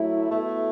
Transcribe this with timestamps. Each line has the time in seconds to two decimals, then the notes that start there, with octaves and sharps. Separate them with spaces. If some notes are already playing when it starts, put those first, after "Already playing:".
Already playing: F#3 A3 E4
0.29 B2 A3 E4